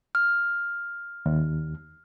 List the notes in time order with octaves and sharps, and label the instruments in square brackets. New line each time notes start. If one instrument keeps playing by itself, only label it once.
[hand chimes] F6
[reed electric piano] D#2